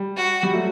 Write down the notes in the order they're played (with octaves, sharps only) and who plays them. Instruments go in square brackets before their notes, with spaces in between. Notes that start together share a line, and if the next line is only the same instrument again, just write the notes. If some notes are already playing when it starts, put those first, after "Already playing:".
Already playing: [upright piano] G3
[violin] F#4
[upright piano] G3
F#3 A3